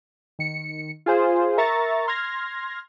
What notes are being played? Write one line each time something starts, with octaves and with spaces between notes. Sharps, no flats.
D#3 C#7
F4 G#4 C5
A#4 E5 A#5 C#6 A6
C6 F6 G#6 A#6